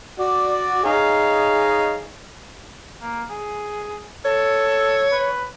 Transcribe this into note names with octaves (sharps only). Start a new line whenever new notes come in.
F#4 D5
D#4 G#4 C#5 D#5 F5
A#3
G#4
A4 C#5
B4